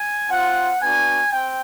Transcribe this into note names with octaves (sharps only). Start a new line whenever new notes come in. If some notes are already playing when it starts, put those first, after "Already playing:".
Already playing: G#5
C4 F4 F#5
B3 D4 F#4 G#5
C4 G5